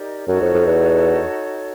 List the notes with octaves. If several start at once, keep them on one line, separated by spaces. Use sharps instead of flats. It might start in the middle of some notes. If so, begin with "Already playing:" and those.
Already playing: D#4 G4 A#4 D5
F#2 D#4 F#4 A4 C#5
F2
F2
E2